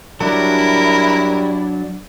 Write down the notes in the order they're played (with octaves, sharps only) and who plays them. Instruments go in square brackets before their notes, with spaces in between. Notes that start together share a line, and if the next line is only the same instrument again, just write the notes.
[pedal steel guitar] F#3 D4 [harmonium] G3 [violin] E4 [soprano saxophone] A#4